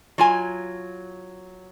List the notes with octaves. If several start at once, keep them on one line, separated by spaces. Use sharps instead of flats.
F#3 F4 G#5